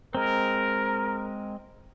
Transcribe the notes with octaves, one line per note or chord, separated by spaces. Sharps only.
G#3 C4 A#4